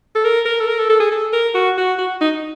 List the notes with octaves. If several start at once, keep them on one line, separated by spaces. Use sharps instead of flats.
A4
A#4
A#4
A4
A#4
A4
A4
G#4
A4
A#4
F#4
F#4
F#4
D#4